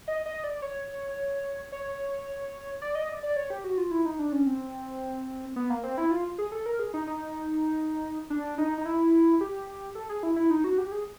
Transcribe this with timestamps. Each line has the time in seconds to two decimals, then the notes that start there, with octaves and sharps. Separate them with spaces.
0.08 D#5
0.26 D#5
0.44 D5
0.62 C#5
1.72 C#5
2.82 D5
2.95 D#5
3.09 D5
3.23 D5
3.36 C#5
3.50 G4
3.64 F#4
3.78 F4
3.91 E4
4.05 D#4
4.19 D4
4.33 C#4
4.46 C4
5.56 B3
5.70 A#3
5.84 C4
5.98 E4
6.11 F4
6.38 G#4
6.52 A4
6.66 A#4
6.79 G#4
6.94 D#4
7.07 D#4
8.30 D4
8.58 D#4
8.78 D#4
8.85 E4
9.41 G4
9.95 A4
10.09 G#4
10.23 E4
10.36 E4
10.50 D#4
10.64 F#4
10.78 G4
10.92 G#4